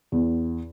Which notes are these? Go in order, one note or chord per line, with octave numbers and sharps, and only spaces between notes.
E2